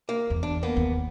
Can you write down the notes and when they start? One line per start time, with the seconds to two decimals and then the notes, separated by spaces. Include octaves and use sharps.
0.09 A#3
0.30 E2
0.43 D4
0.63 A#3 B3
0.76 D#2